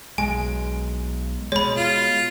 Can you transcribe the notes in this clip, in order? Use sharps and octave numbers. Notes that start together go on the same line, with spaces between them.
B1 G#3 G#5
B2 G#3 C#5 B5
F4